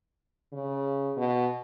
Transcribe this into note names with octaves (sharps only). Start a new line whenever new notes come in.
C#3
B2